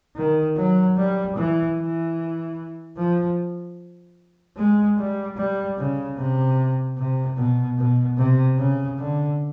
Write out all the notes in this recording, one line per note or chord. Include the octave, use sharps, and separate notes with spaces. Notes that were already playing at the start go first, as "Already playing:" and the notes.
D#3
F#3
G3
E3
E3
F3
G#3
G3
G3
C#3
C3
C3
B2
B2
C3
C#3
D3